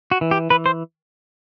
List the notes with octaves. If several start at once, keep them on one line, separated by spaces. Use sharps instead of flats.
F#4
E3
G4
E3 B4
C5